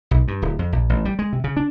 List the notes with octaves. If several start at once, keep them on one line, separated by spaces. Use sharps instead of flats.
B1
G2
D1
F2
A#1
A1
G3
G#3
C3
C#3
D4